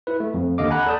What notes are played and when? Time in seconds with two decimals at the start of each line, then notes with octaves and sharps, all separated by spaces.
0.07 E4 B4
0.20 A3
0.34 F2
0.58 D#2 D3 D#5 F5 D6
0.70 F#5 G#5 A#5 B5 F#6
0.86 A4 D5 A5 D#6 G6